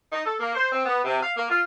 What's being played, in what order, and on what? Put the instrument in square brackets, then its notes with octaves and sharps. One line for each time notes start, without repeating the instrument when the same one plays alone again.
[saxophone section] D#4
A4
A#3
C5
C4
B3
C3
F5
A#3
F4